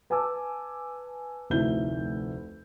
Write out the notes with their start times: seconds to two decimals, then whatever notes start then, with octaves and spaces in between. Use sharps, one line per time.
0.10 B4 G#5 A5 D6 E6
1.50 F1 D2 D#4 E4 G6 G7